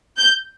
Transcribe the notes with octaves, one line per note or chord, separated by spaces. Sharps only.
G6